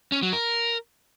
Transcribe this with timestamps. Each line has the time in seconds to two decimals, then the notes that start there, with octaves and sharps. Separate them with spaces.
0.12 C#4
0.22 F#3
0.33 A#4